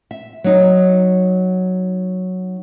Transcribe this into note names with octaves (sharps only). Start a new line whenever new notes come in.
E5
F#3 D#4